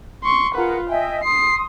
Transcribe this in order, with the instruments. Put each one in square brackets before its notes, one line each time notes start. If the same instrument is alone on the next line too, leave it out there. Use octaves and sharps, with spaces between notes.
[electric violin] C6 C#6
[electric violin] F4 B4 [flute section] G#4 A#4 F#5
[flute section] D#5 E5 G#5 [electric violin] G5
[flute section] C6 D#6 [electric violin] C7